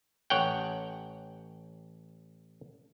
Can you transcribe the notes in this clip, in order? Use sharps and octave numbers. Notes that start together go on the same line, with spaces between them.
A1 C#5 F#5 G5